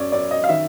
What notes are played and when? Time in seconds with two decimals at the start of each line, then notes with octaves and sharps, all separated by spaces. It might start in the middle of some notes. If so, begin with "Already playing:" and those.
Already playing: F#2 C#5 D5
0.12 F#2 D5
0.31 D#5
0.44 F5
0.49 D#3 E5